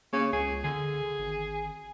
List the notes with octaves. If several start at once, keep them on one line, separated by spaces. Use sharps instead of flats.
C#3 A#3
C#2 G#4
D3 G#4
G#1